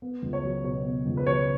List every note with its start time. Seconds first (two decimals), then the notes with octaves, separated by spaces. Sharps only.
0.02 B3
0.22 C#2
0.33 C#5
0.44 F#3
0.64 B2 C#5
0.85 B3
1.06 C#2
1.17 B4
1.27 F#3 C#5